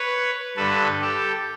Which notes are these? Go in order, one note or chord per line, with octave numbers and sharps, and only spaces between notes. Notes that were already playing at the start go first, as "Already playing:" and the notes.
Already playing: B4 C#5
G2 D3 A4 B4
G4 A4